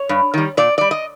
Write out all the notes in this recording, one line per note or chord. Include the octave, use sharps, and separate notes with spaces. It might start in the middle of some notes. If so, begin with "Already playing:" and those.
Already playing: C#5
G2
D#3 G3
A#2 D5
G3 D5
D#5